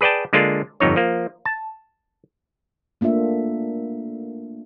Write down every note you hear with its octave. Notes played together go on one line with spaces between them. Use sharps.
G#4 B4 D5 G5 A5
D3 G#3 A#3 D4 F4
G1 F2 D#4 C#5
F3 A#3
A5
A3 A#3 D4 F4 E5